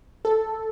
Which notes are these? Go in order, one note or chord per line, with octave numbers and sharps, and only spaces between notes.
A4